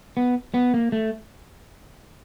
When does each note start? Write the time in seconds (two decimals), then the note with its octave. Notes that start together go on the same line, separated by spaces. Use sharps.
0.17 B3
0.54 B3
0.74 A#3
0.92 A3